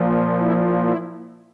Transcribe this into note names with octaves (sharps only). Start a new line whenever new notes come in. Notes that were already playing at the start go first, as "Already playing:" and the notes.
Already playing: A#2 F3
E4
E4